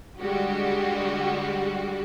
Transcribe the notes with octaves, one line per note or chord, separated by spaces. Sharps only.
D3 G3 G#3 F#4 G4